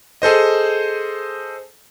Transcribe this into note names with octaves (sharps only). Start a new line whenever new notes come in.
G#4 A4 C5 D#5